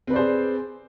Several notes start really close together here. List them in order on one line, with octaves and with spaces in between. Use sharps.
C4 B4 D5 C5 G#4